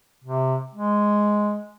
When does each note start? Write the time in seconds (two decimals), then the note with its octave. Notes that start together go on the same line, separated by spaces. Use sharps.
0.24 C3
0.74 G#3